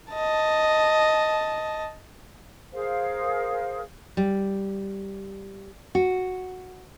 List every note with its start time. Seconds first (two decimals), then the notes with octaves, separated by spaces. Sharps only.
0.13 D#5 A5
2.73 G#4 A#4 C5 F5
4.17 G3
5.95 F#4